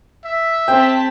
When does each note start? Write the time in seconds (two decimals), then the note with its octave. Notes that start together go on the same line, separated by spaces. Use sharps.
0.25 E5
0.68 C4 G#4 G5 A5 B6